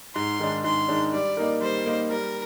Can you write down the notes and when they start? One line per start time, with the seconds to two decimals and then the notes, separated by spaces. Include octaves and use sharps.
0.15 G#2 C6
0.39 D#3 G#3 D4
0.64 G#2 C6
0.88 D#3 G#3 D4
1.13 G3 D5
1.37 A#3 D#4 A#4
1.61 G3 C5
1.86 A#3 D#4 A#4
2.10 G3 A#4